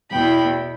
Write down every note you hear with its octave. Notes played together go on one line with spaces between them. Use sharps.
E2 B2 B3 E4 G5 B5